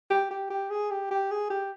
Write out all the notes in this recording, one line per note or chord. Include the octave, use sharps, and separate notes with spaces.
G4
G4
G4
G#4
G4
G4
G#4
G4